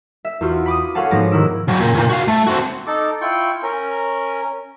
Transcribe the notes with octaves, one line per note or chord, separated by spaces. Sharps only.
E5
E2 F4 F#4
B5 D6 D#6
C#4 A4 C#5 F5 F#5 A5
G#2 F3 B3 F#4 D6 A#6
C3 D#3 E4 E6 D7
C#3 F#3
A#2
C#2 A#2
F#4 F5
A3
C4 F#4
D#4 A4 D6
E4 F4 G5 C#6
C#4 A#4